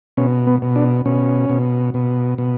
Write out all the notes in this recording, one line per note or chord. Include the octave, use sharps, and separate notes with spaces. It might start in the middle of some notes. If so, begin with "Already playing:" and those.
B2 C#4
B3
B2
D4
B2 C#4
B2
B2
B2